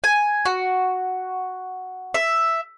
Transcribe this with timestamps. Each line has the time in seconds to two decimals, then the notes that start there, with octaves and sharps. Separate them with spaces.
0.04 G#5
0.45 F#4
2.14 E5